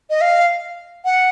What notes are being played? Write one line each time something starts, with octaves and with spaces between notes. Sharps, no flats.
D#5
F5
F#5